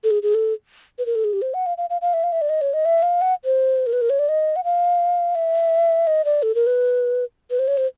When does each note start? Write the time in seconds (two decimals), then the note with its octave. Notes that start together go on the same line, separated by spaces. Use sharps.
0.04 A4
0.11 G#4
0.23 G#4
0.35 A4
0.99 B4
1.06 A#4
1.15 A4
1.24 G#4
1.33 G4
1.42 C5
1.54 F#5
1.66 F5
1.78 F5
1.90 F5
2.01 F5
2.14 E5
2.24 F5
2.32 E5
2.41 D5
2.49 D#5
2.61 C#5
2.74 D#5
2.85 E5
3.03 F5
3.21 F#5
3.45 C5
3.87 A#4
3.93 B4
4.01 A#4
4.10 C#5
4.19 D5
4.29 D#5
4.56 F#5
4.64 F5
5.35 E5
6.07 D#5
6.25 D5
6.43 A4
6.55 A#4
6.67 B4
7.51 B4
7.59 C5
7.68 C#5
7.77 C5